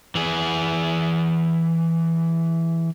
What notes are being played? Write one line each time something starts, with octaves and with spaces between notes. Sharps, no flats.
E3 G#4